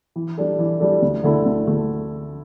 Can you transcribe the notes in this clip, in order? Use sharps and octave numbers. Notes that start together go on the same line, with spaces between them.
E3
G3 D4 A4
E3
G3 D4 A4
D2
D3 A3 E4 A4
D2
D3 A3